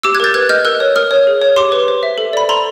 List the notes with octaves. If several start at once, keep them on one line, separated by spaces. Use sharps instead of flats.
G4 D6 E6
F#6 G#6
A#4 G6 A6
B4 F#6 G#6
D#5 F6 G6
A#4 E6 F#6
C#5
A#4 D#6 F6
C#5
G#4
C#5
G4 C6 D6
B4
C5
E5
A4
D5 B5
A4 A#5 C6